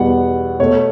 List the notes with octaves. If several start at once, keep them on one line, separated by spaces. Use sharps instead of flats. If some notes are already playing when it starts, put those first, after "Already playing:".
Already playing: E2 B2 G3 B3 F#5
B2 A3 C#5